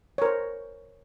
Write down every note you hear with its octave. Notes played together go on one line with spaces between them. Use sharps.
A#4 C5 C#5